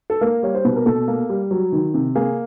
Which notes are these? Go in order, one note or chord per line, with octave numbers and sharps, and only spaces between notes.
A4
A#3 A#4
G3 C#5
C5
B2 B4
A#4
B2 A4
A#3
G3
F#3
D#3
C3
A#3 G#4